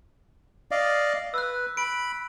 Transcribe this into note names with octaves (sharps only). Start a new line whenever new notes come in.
D5 D#5 F5
B4 E6 F#6
B5 D7